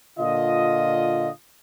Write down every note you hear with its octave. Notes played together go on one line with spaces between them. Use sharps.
A#2 D3 F4 D#5